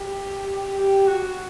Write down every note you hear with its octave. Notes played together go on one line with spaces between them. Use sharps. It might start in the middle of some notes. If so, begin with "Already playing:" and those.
Already playing: G4
G4
F#4